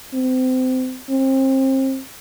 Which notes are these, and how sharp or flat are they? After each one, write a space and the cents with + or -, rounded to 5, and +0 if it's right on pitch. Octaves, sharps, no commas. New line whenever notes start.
C4 -30
C4 +30